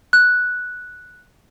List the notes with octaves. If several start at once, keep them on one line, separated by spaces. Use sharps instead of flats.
F#6